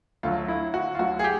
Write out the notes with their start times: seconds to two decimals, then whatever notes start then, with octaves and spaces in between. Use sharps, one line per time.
0.23 D2 D3 F#3 F4
0.48 E4
0.74 F#4
0.95 F4
0.99 D2 D3 F#3 F#4
1.19 G#4
1.24 G4